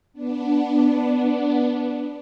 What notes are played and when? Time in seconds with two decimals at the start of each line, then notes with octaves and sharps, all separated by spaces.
0.13 B3 D4